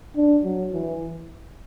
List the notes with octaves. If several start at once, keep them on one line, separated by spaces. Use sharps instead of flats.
D4
F#3
E3